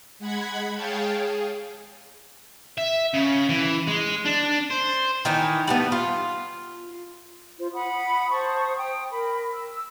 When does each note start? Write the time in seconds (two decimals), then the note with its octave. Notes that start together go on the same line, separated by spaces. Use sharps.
0.19 G#3 F#5 B5 G#6
0.74 G#4 C#5 F5 G5 A5
1.16 G#4
2.78 E5
3.14 C#3
3.49 E3
3.88 G#3
4.25 D4
4.70 C5
5.25 D#3 E3 D#4 E4
5.67 G3 A3 B3
5.92 F4
7.59 F4 C5
7.73 F#5 B5 D#6
8.31 C5 A5 C#6 D#6
8.77 G5 D#6
9.12 A#4 B5
9.54 E6